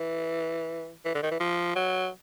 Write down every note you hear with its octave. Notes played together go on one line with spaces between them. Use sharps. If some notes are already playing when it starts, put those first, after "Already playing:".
Already playing: E3
E3
D3
D#3
E3
F3
F#3